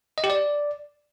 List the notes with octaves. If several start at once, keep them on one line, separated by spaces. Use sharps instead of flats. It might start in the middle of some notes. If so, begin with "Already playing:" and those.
D#5
G4
D5